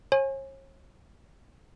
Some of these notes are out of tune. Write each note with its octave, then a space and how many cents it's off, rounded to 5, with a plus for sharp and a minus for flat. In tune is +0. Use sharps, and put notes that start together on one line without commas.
C#5 -40 G#5 +0